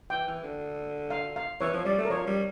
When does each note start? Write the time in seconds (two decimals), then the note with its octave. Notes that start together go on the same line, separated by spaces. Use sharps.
0.10 E3 G5
0.27 E3
0.44 D3
1.10 F5
1.36 F5
1.61 E3 C#5
1.73 F3
1.85 G3 D5
1.98 A3
2.05 A#4
2.10 F3 C#5
2.27 G3